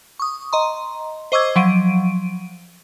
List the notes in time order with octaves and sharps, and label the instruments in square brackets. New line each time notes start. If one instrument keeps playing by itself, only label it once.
[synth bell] C#6 D#6
D#5 A#5 C6
C5 D#5 C#6 D6 E6 G#6
F3 F#3 D7 D#7